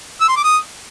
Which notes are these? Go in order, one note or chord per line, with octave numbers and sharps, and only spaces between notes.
E6
C6
D6
D#6